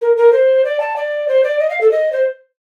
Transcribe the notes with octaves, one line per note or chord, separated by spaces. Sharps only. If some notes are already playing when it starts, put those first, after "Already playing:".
A#4
A#4
C5
D5
A5
D5
C5
D5
D#5
F5
A4
D#5
C5